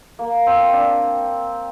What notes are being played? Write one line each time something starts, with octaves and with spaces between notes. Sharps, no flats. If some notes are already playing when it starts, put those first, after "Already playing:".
A#3
C4
D4